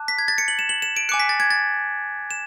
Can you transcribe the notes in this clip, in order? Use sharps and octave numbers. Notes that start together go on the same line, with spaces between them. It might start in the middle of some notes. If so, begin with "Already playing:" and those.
Already playing: A5 D6 F#6
B6
G#6
A6
C#7
F#7
E7
F#7
E7
D7
G#5 D6 F#6 C#7
B6
A6
G#6
A6
E7